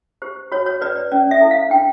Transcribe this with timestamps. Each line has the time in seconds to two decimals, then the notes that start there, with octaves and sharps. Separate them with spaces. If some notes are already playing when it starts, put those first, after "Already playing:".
0.22 G4 C5
0.52 F#4 C#5
0.66 C#5
0.81 B4 D5
0.96 D5
1.12 C#4 D5
1.31 E5
1.41 E4 A4
1.51 F5
1.70 D4 G5